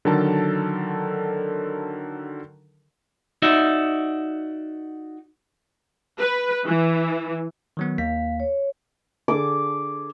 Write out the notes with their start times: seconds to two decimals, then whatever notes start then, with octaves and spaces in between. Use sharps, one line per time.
0.05 D3 D#3 F#3 A4 A#4 A5
3.42 D#4 F#4 D5 E5
6.20 B4
6.65 E3
7.77 D#3 F#3 B3
7.98 D#2 A#3 F5 B6
8.40 C#5
9.28 D3 G#4 A4 D6